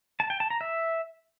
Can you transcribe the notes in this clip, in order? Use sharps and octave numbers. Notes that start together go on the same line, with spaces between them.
A5
G5
A5
A#5
E5